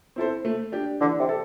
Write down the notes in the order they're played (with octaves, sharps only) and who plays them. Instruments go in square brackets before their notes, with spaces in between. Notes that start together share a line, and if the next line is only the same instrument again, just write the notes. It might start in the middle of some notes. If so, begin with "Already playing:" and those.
[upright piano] C4 E4 A4 C5
A3
D4 G4
[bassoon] D3 [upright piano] E3
[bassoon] C3
[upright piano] A4